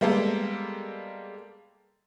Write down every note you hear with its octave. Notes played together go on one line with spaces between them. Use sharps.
G3 G#3 A#3 B3 A4